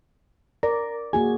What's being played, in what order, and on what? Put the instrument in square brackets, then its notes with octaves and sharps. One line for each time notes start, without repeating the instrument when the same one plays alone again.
[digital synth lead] A#4 [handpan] D5
[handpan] A#3 F#4 G#4 [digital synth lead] G#5